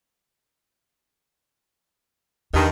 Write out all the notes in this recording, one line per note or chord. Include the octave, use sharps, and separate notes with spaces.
E2 G2 D#3